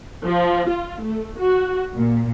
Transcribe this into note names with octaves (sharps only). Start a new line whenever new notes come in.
F3
F4
A3
F#4
A#2